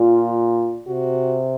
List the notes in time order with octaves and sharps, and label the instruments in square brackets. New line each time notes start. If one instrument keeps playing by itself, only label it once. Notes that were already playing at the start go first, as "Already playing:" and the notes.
Already playing: [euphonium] A#2 [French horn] F4
[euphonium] C3 [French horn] F#4